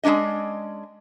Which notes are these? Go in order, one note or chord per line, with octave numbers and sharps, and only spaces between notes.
G#3 A3 C#4 D4 D#5